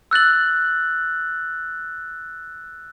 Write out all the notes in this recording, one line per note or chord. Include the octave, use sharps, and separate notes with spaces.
E6 F#6 A6 F#7